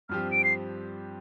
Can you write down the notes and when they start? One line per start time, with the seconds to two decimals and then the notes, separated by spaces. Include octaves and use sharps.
0.09 G2 F3 C4 G4 F6
0.31 D7
0.44 C7